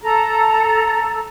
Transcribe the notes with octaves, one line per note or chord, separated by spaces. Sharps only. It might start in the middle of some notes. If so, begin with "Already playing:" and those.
A4 A#5